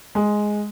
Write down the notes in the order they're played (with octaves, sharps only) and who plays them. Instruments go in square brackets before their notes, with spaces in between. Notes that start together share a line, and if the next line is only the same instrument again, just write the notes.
[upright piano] G#3